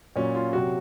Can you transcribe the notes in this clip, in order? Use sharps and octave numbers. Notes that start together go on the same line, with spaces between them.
A#2 F#3 C#4
F4
C3 F#3 F#4